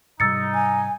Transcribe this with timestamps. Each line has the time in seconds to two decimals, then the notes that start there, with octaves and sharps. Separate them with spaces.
0.20 G#2 C3 G3 D#4 E6 A6 C#7
0.54 G#5